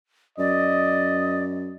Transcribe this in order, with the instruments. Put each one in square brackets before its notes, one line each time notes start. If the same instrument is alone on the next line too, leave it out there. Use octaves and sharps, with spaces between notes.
[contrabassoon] F#2 [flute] D5 [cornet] D#5